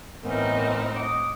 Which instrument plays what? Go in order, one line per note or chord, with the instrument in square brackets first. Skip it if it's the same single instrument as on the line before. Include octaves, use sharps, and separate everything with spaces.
[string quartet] A2 C4 D#4 [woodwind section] E3 B3 A#4
[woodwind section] F#5 D6 D#6